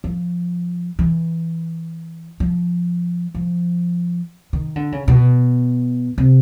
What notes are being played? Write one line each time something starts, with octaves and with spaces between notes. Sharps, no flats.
F3
E3
F3
F3
D#3
D3
C#3
B2
C3